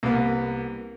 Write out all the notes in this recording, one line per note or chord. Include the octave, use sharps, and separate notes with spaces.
C2 A#3 B3